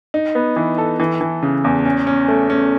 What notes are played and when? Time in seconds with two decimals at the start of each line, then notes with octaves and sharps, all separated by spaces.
0.14 D#4
0.35 B3
0.56 E3
0.78 A4
1.00 E3
1.21 E3
1.43 C#3
1.64 E2
1.85 C#4
2.07 C#4
2.28 A3
2.50 C#4